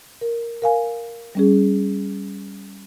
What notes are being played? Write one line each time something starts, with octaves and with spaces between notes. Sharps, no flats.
A#4
A#4 F5 G#5
G3 C#4 G#4